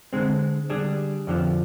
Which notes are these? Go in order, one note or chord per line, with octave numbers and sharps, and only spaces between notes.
D3 G#3 C4
D3 G3 D4 G#4
F2 D3 F3